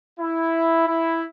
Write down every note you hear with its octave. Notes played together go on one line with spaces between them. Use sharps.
E4
E4